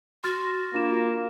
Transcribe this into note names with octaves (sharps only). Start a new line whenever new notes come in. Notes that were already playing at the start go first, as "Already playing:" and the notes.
F#4 C6 F6 A6
A#3 D4 F4 E7